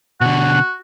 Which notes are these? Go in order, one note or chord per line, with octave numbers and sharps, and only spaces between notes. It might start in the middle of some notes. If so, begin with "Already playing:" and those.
B2 D3 F#4 F#5